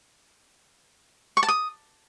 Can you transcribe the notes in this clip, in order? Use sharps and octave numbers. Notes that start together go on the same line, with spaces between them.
C#6
A5
D#6